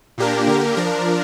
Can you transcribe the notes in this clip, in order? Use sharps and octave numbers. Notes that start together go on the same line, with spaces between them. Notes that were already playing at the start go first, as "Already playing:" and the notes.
A#2 A#3 D4 G4 A#4
D3 A#3 G4 A#4
F3 D4 A#4